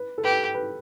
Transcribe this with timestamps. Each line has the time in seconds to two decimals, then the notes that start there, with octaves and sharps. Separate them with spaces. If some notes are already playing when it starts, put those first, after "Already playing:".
Already playing: B4
0.18 A4
0.24 G4 B4
0.54 B4